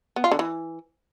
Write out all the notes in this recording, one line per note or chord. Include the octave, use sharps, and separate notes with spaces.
B3
F4
D3
E3